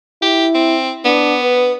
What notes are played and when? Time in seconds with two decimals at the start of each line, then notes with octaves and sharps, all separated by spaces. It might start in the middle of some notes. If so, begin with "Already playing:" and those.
0.22 E4 G4
0.54 C4
1.05 B3 D4
1.42 B4